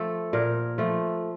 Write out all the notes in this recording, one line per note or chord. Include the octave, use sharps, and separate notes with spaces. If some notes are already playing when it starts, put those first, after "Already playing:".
Already playing: F3 A3 A4
A#2 A#4
F3 A3